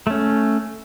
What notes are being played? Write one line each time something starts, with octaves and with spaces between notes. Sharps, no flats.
A3 C#4